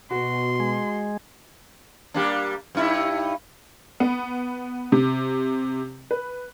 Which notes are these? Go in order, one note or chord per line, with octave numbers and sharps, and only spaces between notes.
B2 F#4 C6
G#3
G3 A#3 D4
G2 D#4 E4
B3
C3
B4